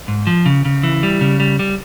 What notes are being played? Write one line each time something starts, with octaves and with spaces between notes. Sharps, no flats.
G#2
F3
C#3
C#3
E3
G3
C#3
G3
G3